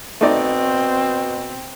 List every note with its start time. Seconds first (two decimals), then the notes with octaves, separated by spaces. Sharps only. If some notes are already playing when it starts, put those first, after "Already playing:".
0.21 B2 A3 C4 D#4 D5